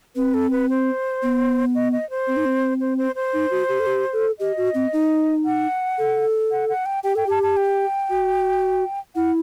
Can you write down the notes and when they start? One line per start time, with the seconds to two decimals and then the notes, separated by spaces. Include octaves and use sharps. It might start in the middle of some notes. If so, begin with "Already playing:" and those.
0.16 C4 B4
0.34 A4
0.51 B4
0.70 C5
1.23 B3
1.75 D#5
1.92 D#5
2.10 C5
2.27 C4
2.37 D#4
2.45 C4
2.81 C5
2.98 C5
3.15 C5
3.34 D#4
3.51 F#4
3.69 G4
3.80 A4
3.87 G4
4.13 A4
4.39 G4 D#5
4.57 F#4
4.75 C4
4.93 D#4
5.45 F#5
5.98 A4
6.51 F#5
6.69 F#5
6.86 G5
7.04 G4 G5
7.15 A4 G5
7.26 G4 A5
7.43 A5
7.57 G5
8.10 F#4
9.15 E4 F#5